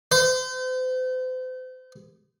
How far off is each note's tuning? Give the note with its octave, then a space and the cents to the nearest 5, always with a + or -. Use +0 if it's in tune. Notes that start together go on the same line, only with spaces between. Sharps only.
C5 -40